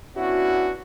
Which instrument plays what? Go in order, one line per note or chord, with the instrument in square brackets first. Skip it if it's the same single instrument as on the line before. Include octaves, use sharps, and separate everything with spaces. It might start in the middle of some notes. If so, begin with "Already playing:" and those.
[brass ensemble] B3 C#4 D4 E4 F#4